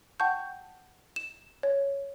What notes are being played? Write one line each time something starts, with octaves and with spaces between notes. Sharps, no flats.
F#5 G5 A5 C#6 G6
E7
C#5